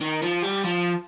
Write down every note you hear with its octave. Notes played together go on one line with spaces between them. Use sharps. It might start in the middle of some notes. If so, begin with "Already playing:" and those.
D#3
F3
G3
F3